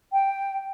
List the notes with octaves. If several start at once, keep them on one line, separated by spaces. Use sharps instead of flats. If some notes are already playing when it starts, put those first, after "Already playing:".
G5